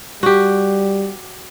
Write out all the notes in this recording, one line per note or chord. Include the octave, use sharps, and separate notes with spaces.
G3 F#4 G4